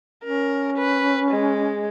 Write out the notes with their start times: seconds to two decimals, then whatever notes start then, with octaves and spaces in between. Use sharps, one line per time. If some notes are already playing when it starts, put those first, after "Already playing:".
0.25 C#4 A#4
0.78 B4
1.31 G#3